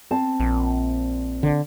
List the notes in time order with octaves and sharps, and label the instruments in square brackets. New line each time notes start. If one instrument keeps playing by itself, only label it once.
[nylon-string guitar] C4 C5 A5
[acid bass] A#1
[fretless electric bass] D3